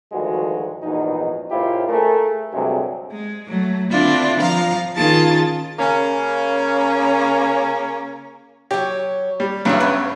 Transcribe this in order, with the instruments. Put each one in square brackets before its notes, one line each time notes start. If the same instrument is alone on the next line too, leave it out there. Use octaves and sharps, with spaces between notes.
[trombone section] D2 G2 D#3 F3 G#3 F#4
A#1 E2 G#2 B2 D#4
C#2 A#2 E4 F4 G4 C5
A3 G#4 A#4
D2 G2 C3 F#3 G#3 G#4
[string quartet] G#3
F#3 A3
D3 C4 D4 E4 F4
F3 F5 A#5
D#3 C#4 F4 G#4 A5 A6
[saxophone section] C#3 A#3 C#4
[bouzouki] F#3 C#5 [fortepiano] G4
[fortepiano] G3
[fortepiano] G2 C#3 F#3 [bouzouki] E3 E5
[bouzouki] B3 B4